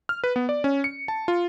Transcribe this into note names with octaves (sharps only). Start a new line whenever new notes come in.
F6
B4
B3
D5
C#4
C#7
A5
F4